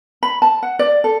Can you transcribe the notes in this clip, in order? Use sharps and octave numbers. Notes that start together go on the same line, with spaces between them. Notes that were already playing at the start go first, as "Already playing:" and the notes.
B5
A5
F#5
D5
A4